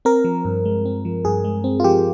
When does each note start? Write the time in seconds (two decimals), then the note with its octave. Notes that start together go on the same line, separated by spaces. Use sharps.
0.05 C4 A#4
0.25 F3
0.45 G2
0.65 G#3
0.85 C4
1.05 F3
1.25 G2 G#4
1.44 G#3
1.64 C4
1.80 F4
1.84 F3 G4